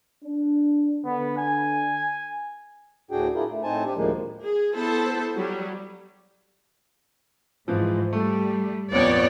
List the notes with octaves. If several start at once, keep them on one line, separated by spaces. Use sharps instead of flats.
D4
D3 B3
G#5
D2 A2 D4 F#4 G#4 G5
D4 E4 F4 G#4 A#4
A3
A2 C4 D#4 C5 G#5 A5
D4 G4
D2 A2 D#3 F3 G#3 A#3
G#4
B3 E4 A4 C5 A5
F#3 G3
G#2 E3 F3
G3 A3
A#1 F2 B3 C#5 D5